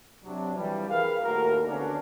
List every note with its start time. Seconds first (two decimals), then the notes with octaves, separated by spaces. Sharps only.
0.24 C3 F#3 D4
0.56 C2 E3 F3 G3
0.88 G#4 A#4 B4 F5
1.23 D#2 A2 F#4 A#4
1.66 D3 B3 C#4 D4